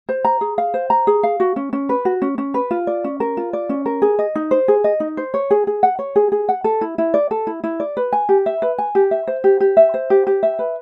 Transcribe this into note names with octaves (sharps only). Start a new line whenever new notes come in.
C5
A#5
G#4
F5
C5
A#5
G#4
F5
F#4
C#4
C#4
B4
F#4
C#4
C#4
B4
F4
D5
C#4
A#4
F4
D5
C#4
A#4
G#4
D#5
D#4
C5
G#4
D#5
D#4
C5
C#5
G#4
G#4
F#5
C#5
G#4
G#4
F#5
A4
E4
E4
D5
A4
E4
E4
D5
B4
G#5
G4
E5
B4
G#5
G4
E5
C5
G4
G4
E5
C5
G4
G4
E5
B4